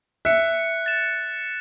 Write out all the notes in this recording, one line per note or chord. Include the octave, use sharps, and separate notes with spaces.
E5 F#6 C#7
A6 E7